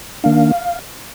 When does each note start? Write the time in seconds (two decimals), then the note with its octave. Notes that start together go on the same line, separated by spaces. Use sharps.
0.24 D#3 A#3 D4 F5